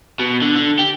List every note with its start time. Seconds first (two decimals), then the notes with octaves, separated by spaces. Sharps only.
0.20 B2
0.42 D3
0.56 D3
0.79 G4